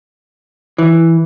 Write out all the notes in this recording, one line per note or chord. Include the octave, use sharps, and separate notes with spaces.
E3